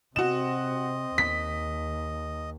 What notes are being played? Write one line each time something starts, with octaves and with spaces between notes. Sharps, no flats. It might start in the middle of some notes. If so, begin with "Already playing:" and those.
C3 C4 F#4 D#5 E7
D#2 B6